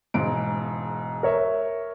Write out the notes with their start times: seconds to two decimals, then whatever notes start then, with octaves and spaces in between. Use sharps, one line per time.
0.14 E1 G#2 D7
1.23 A#4 C#5 E5